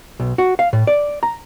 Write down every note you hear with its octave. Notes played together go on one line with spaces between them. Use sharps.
B1
F#4
F5
A2
D5
A#5